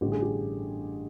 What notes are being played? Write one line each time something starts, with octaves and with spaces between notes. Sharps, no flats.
A1 G2 D3 G4
G#4
G4